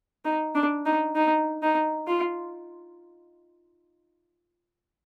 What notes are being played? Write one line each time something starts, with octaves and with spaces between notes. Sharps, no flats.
D#4
D4
D#4
D#4
D#4
F4